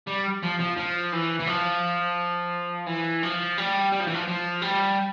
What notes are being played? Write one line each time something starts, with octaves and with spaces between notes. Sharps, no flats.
G3
F3
F3
F3
E3
E3
F3
E3
F3
G3
G3
F3
E3
F3
F3
G3